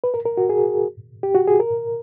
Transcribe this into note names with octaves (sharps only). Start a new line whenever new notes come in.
B4
A#4
A#4
F#4
G#4
G4
F#4
G#4
A#4